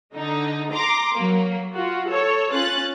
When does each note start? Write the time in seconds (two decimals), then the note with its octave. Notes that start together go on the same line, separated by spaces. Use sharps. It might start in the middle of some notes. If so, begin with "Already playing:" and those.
0.15 D3 D#4
0.72 A#5 C6 D6
1.14 F#3 A#3
1.74 F4 F#4
2.09 A4 C#5
2.52 C#4 F4 F#6 A6